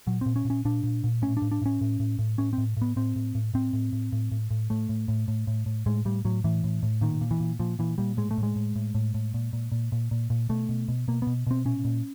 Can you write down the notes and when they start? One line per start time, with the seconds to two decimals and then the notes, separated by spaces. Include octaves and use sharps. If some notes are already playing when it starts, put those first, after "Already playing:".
0.07 A#2 F#3
0.21 A#2 C4
0.36 C#4
0.45 A#2
0.50 C#4
0.65 A#2 D4
0.83 A#2
1.04 A#2
1.22 A2 C#4
1.37 A2 D4
1.51 D4
1.62 A2 C#4
1.81 A2
2.00 A2
2.19 A2
2.38 A2 C#4
2.53 C4
2.58 A2
2.77 A2 B3
2.96 A2 C4
3.16 A2
3.35 A2
3.54 A2 C4
3.73 A2
3.93 A2
4.12 A2
4.32 A2
4.51 A2
4.70 A2 A3
4.89 A2
5.08 A2
5.28 A2
5.47 A2
5.66 A2
5.86 A2 G#3
6.05 A2 G3
6.25 A2 F#3
6.44 A2 E3
6.64 A2
6.83 A2
7.01 A#2 D#3
7.21 A#2
7.31 E3
7.40 A#2
7.59 A#2 F3
7.79 A#2 E3
7.98 A#2 G3
8.17 A2 G#3
8.31 A3
8.38 A2
8.43 G#3
8.56 A2
8.76 A2
8.95 A2
9.14 A2
9.34 A#2
9.53 A#2
9.72 A#2
9.92 A#2
10.11 A#2
10.30 A#2
10.49 B2 A3
10.69 B2
10.88 B2
11.08 B2 A#3
11.22 B2 B3
11.47 B2 C4
11.65 A#2 C#4
11.85 A#2